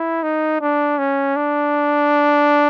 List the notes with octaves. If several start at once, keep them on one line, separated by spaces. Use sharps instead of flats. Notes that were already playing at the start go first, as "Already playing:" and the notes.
Already playing: E4
D#4
D4
C#4
D4